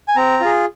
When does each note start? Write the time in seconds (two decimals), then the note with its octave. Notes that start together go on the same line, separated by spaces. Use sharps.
0.08 G#5
0.16 C4 A#5
0.41 F4 G#4